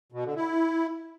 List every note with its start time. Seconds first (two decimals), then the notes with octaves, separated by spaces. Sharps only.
0.12 B2
0.24 D3
0.36 E4